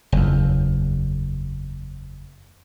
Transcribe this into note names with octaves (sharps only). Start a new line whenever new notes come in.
F#1 E2